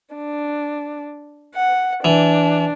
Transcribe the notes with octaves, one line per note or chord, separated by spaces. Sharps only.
D4
F#5
E3 D4